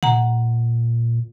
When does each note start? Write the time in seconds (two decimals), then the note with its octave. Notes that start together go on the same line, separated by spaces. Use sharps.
0.03 A#2 F#5 A#5